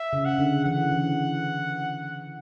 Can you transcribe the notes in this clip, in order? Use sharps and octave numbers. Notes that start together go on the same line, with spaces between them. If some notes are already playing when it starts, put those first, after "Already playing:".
Already playing: E5
C#3
F#5
D3
E3 F#5
E3